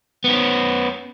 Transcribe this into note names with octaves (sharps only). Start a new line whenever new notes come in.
B3 C#4